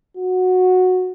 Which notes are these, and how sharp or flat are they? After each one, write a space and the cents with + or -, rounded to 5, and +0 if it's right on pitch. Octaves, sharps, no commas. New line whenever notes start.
F#4 -10